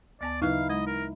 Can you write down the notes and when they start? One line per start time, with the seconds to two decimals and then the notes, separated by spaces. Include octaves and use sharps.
0.21 D2 B3 D5 A5
0.42 C#3 F#3 D#4 E4 B4 F5
0.70 G#3 D#5
0.87 A#4